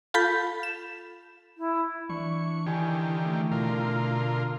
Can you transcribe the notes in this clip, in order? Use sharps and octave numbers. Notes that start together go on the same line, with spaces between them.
F4 A4 B5 G6 A6 B6
E7
E4
E3 D4 E4 C#6
D3 D#3 E4 G4 G#5
A3 E4
B2 D3 F4 A#4